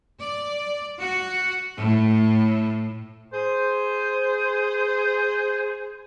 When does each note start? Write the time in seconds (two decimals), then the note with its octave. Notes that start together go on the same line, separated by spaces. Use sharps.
0.21 D5
0.98 F#4
1.76 A2
3.32 G#4 C5